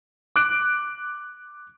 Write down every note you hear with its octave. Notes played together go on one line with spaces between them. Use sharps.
D6 F#6 D7